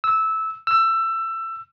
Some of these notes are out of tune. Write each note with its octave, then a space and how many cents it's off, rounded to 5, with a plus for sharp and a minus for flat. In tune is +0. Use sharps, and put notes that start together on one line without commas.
E6 -15
E6 +20